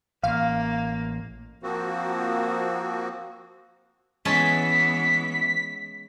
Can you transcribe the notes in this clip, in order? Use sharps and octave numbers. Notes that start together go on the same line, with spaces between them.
A1 A#3 F5
F3 A#3 C4 F#4
E3 G#3 B3 C#4 A5 B6